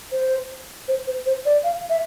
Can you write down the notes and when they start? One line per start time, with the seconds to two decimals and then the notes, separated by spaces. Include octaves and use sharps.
0.12 C5
0.88 C5
1.07 C5
1.26 C5
1.45 D5
1.64 F5
1.90 E5